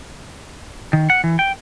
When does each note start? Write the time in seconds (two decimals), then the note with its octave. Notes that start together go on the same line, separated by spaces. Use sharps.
0.93 D#3
1.10 F#5
1.24 E3
1.39 G5